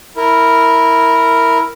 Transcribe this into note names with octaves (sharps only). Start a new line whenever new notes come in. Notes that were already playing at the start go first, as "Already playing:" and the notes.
E4 A#4